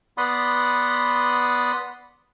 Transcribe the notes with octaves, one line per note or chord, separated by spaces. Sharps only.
B3 D5 F#5 B5 C6 D#6